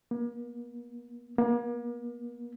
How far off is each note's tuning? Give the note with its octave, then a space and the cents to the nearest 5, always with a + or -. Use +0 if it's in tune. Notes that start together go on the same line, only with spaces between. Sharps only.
A#3 +40
A#3 +40